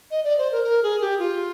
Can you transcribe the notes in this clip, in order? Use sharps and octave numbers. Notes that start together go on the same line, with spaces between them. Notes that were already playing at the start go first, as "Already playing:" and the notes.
D#5
D5
C5
A#4
A#4
G#4
G4
F4